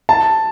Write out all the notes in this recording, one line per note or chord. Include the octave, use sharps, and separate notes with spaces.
A5